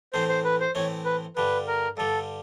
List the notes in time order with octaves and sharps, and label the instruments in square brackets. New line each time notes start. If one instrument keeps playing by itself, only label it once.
[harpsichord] A2 E3 A3 C4 [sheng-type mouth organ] C5
[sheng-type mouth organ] C5
B4
C5
[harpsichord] A2 E3 A3 C4 [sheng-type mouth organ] C#5
[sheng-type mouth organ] B4
[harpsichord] G2 D3 G3 [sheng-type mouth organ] B4
[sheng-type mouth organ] A#4
[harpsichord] G2 D3 G3 [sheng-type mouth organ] A4